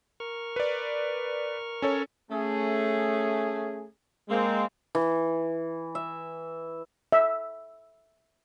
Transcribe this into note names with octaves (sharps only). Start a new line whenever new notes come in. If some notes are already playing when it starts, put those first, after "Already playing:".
A#4 C#6 F6
B4 D5
C#4 A4 C#5
A3 C#4 G#4
G#3 A#3 C4
E3
E5
E5